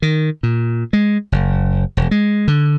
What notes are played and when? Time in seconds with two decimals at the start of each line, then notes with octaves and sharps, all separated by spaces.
0.02 D#3
0.43 A#2
0.93 G#3
1.32 F#1
1.97 E1
2.11 G#3
2.48 D3